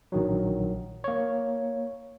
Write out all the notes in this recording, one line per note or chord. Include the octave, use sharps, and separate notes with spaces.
A#1 D#3 F#3
A#3 C#5